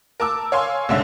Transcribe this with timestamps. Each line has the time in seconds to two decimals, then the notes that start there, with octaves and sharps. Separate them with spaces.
0.20 A#4 A5 D6 E6
0.52 C#5 F5 G#5 C6
0.89 C2 G#2 D3 C#4 E5